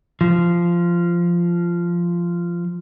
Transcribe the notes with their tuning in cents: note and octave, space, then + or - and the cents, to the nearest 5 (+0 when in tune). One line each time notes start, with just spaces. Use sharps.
F3 -15